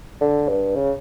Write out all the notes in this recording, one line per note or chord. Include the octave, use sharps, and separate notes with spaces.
D3
G2
C#3